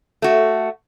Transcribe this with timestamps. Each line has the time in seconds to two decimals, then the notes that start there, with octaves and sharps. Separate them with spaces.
0.22 A3 F#4